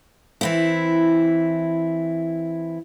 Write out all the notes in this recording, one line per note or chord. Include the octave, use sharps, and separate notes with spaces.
E3 C4 E4